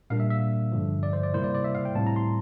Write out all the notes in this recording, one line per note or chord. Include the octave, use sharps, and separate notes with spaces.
A#2 G3 A#3 D4 F5
E5
E5
G2 D3 F3
D5
C5
D5
C3 G3 A#3 E4 C5
D5
D5
E5
F5
G5
A2 G3 C4 E4 A5
A#5
C6